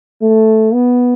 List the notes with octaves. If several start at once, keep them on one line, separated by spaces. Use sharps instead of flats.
A3
B3